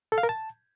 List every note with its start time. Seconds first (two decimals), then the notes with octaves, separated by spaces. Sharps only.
0.12 A4
0.18 F5
0.23 A#4
0.29 A5